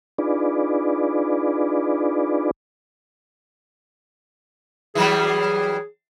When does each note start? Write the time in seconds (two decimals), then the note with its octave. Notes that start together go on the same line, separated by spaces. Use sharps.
0.18 D4 D#4 F4 G#4 B4 D5
4.95 E3 F#3 G3 G#4